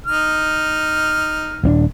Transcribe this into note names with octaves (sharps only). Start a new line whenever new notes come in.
D#4 F6
D#1 C4 D4